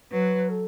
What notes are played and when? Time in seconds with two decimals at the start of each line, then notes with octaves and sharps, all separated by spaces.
0.11 F#3 B4
0.49 A4